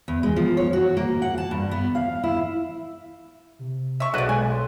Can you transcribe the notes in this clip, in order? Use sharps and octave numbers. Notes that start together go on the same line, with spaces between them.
E2
G#3
F3
C#5
F#4
A#3
F#5
A5
G2
B3
F5
E4
C3
E5 C#6
B1 F#4 G#4 B4 D5
G#3 G#5
C6